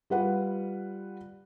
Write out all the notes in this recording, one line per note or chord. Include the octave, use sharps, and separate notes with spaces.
G3 F4 B4 F#5